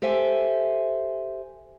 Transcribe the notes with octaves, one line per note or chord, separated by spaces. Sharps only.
G4 A4 C5 E5 G#5